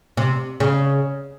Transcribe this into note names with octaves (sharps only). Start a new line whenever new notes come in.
C3
C#3